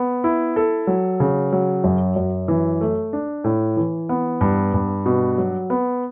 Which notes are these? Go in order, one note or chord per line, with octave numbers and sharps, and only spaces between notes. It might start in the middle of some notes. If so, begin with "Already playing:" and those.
Already playing: B3
E4
A4
F#3
C#3
F#3
F#2
F#2
E3
A3
D4
A2
E3
B3
G2
G2
B2
F#3
B3